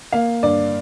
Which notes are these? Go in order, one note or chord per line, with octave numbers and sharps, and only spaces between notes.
A#3 F5
G2 D5